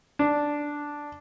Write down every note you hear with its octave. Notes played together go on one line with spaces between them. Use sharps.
D4